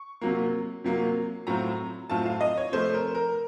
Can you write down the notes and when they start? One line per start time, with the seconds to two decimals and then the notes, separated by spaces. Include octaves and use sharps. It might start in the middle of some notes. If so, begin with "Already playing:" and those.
Already playing: C#6
0.21 C3 F#3 A#3
0.84 C3 F#3 A#3
1.47 A2 F#3 C4 F4 A#5
2.10 A2 F#3 C4 F4 A5
2.26 F5
2.41 D#5
2.57 C#5
2.72 C3 F3 A3 C5
2.94 A#4
3.15 A#4